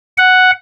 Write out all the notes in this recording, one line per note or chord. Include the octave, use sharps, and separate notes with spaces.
F#5